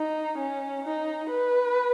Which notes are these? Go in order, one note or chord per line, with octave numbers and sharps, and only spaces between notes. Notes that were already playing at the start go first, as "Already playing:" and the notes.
Already playing: D#4
C#4
D#4
B4